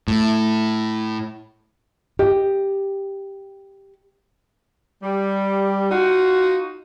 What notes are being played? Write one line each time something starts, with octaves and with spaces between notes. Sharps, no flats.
A2
G4 D#5
G3
D#4 F4 F#4